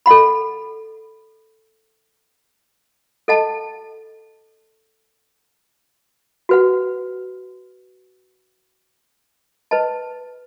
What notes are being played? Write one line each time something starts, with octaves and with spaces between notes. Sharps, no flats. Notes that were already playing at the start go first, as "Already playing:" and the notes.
A4 D#5 F#5 B5
A4 D#5 F#5 A5
F#4 B4 F#5
B4 D#5 A5